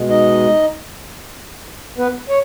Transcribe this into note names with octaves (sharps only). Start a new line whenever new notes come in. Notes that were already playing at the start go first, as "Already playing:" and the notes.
Already playing: B2 G#3
D#4 D#5
B3 B4
C#5